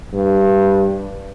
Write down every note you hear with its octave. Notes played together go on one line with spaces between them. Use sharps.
G2